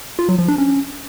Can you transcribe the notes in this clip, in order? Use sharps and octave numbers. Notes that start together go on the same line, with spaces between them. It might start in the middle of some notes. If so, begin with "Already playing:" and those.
F4
F#3
F3
D4
C#4